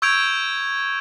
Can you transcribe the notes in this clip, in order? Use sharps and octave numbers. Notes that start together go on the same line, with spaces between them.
C#6 E6 G6 G#6 D7 F7